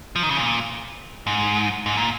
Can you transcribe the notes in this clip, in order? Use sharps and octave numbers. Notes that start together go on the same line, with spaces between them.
F3
D#3
C#3
A#2
G#2
G#2
A#2